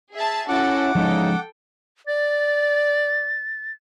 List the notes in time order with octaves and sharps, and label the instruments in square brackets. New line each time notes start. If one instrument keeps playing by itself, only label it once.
[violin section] G#4 E5 A5
[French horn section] C#4 E4 [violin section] F#4 A4 A5 [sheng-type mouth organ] F#5 D6
[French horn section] E2 C#3 D#4 [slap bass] F3 G#3 C#4 [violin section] A4 G5
[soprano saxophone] D5 [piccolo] A6